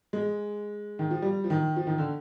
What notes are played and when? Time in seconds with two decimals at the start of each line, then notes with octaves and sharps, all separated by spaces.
0.13 G#3
0.99 D#3
1.10 F3
1.22 G3
1.44 F3
1.50 D#3
1.76 F3
1.87 D#3
1.98 D3